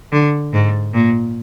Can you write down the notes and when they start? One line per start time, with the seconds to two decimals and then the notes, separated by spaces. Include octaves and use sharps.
0.12 D3
0.53 G#2
0.94 A#2